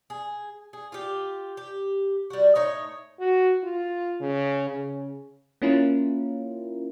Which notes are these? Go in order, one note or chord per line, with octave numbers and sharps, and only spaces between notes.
G#4
G#4
F4 G4
G4
G3 F#4
A2 D#4 C#5
F#4
F4
C#3
C#3
A#3 C#4 E4 F4 A#4